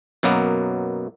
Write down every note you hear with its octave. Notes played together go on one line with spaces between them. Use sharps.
F#2 B2 F#3 A#3 B3